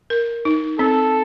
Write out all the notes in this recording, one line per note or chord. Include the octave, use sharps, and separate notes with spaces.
A#4
D#4
C4 A4